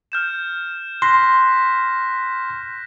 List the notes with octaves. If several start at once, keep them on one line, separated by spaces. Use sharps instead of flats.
F6 G6 E7
C6 F#6 A#6 B6